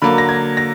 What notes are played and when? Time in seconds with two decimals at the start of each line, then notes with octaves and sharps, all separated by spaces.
0.02 D3 F#3 A#3 B5
0.18 A#6
0.29 G#6
0.57 A#6